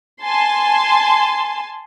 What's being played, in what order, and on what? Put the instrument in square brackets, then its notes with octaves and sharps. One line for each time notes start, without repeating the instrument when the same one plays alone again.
[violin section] G#5 A5 C6